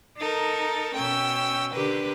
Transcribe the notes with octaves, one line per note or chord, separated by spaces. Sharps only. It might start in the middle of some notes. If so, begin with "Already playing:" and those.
D#4 A4 A#4
B2 C#4 G5 E6
D3 D4 G4 A#4 B4